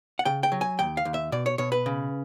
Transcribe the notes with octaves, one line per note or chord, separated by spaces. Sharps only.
F#5
C#3 G5
G5
F#3
G#5
D#2 G5
F5
D#2
E5
B2 D5
C#5
B2 C#5
B4
C#3